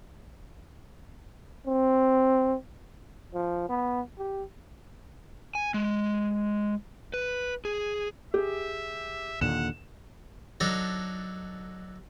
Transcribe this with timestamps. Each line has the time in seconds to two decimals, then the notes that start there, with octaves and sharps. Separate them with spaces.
1.67 C4
3.34 F3
3.69 B3
4.18 G4
5.55 G#5
5.74 G#3
7.14 B4
7.65 G#4
8.34 G4 G#4 E5
9.41 D#2 A#2 D3 F#5 E7
10.60 F#3 D4 D#4 A4 D#5